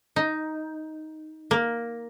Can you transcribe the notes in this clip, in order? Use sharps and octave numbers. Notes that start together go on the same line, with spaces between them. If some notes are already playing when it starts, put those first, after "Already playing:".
D#4
A#3